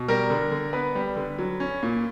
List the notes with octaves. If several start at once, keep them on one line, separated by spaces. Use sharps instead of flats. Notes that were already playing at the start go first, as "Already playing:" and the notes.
Already playing: B2
G3 A#4
D3
D3
B3 B4
G3
D3
F#3
C#4
A#2